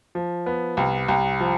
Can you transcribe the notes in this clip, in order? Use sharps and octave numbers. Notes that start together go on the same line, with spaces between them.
F3
B3
C2
C2
F3